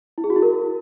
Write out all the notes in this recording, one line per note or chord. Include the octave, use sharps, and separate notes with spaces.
E4
G#4
F#4
E4
A#4